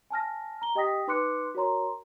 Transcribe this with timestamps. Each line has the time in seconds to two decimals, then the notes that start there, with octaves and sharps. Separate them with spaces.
0.10 G#5 A5 F6 A#6
0.62 A#5 G7
0.75 G4 D#5 G5 D#6 A#6 B6
1.07 D#4 B4 C6 D6 F#6 C#7
1.55 F#4 A#4 C#5 A#5 C6